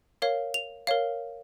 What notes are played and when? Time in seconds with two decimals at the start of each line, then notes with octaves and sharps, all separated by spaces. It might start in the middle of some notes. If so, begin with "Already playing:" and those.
0.22 A#4 C#5 F5
0.54 F7
0.87 A#4 C#5 F5